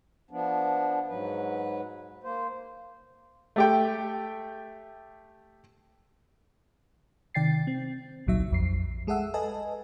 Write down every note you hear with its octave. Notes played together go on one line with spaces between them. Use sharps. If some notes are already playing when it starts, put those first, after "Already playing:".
F3 B3 D4
G#2 F#3 B4
A#3 C5
A3 G4 G5
C3 D#3 D5 G5 A6 C7
C4
G#1 C#2 A#2 F#3 D#4 E5
A#1 F2 C7
G#3 G#4 A4 E5 F#5 E6
A4 B4 D#5 G#5 A5